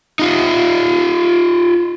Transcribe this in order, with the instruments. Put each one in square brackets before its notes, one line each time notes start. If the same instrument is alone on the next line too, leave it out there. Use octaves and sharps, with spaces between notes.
[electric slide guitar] D#4 F4